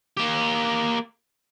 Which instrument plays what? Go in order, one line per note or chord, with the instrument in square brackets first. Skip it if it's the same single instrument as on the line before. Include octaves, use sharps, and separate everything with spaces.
[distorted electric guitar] A#3 G4